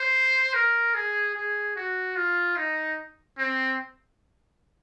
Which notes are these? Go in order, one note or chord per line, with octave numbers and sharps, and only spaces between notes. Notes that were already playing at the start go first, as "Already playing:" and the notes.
Already playing: C5
A#4
G#4
G#4
F#4
F4
D#4
C4